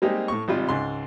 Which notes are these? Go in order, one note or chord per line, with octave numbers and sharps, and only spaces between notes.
G3 G#3 A#3 C4 D#4 G4
A2 C#6
G#1 C3 G3 F4
C#2 G#2 C6